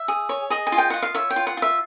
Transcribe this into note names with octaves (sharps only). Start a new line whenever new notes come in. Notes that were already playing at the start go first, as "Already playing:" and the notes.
Already playing: E5
G#4
C#5
G#4 D#5
G#5
F4
G5
F4 F#5
F5
C#5 E5
G5
F4
F#5
F4
E5